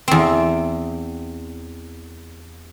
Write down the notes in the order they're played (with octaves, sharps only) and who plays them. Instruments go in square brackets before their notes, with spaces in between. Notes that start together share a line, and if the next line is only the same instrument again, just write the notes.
[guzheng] E2 C4